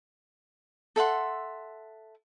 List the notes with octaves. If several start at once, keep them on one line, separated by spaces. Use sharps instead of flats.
A4 E5 F#5 C6